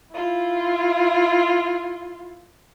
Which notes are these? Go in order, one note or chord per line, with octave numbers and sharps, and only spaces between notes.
E4 F4